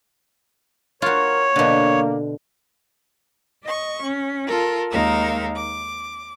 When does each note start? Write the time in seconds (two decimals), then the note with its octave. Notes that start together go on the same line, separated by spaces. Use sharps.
1.02 F4 F#4 A#4 C#5
1.56 B2 D3 A#3
3.63 D#5 C#6
4.02 C#4
4.46 F4 A4 A#4
4.91 D#2 G#3 D#4 A#4 F5 E6
5.56 D6